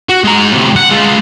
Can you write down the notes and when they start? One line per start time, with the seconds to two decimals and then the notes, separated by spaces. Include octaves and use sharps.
0.09 F#4
0.24 G#3 A#5
0.52 A2 C3
0.76 F#5
0.91 G#3 F4